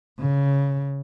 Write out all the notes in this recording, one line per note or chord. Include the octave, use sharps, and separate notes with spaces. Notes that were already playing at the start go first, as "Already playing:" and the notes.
C#3